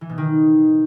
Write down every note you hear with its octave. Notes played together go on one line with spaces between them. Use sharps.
E3
B2
D#3